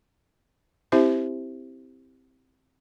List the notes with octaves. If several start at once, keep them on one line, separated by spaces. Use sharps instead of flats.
C4 E4 G4 C5 E5